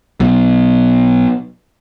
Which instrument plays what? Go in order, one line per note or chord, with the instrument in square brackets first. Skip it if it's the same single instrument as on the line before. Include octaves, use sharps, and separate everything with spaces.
[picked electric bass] B1 B2